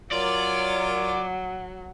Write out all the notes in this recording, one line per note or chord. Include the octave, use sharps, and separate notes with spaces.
F#3 F4 A#4 C#5 D5